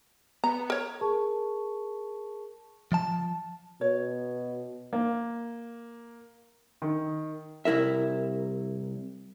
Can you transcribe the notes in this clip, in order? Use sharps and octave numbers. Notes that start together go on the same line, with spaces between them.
B3 A#5
A#4 C#5
G#4 A#4 A5 C#6
F3 A5
B2 C#5
A#3
D#3
C2 E4 A#4 E5